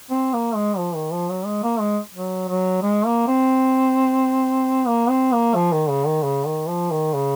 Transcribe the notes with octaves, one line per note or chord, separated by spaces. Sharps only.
C4
A#3
G#3
F3
D#3
F3
F#3
G#3
A#3
G#3
F#3
F#3
G#3
A#3
C4
A#3
C4
A#3
F3
D#3
C#3
D#3
C#3
D#3
F3
D#3
C#3